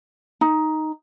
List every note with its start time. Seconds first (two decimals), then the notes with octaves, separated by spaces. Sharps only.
0.41 D#4